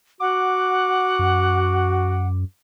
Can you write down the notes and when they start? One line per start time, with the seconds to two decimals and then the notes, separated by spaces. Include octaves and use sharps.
0.20 F#4 F#5 D6
1.19 F#2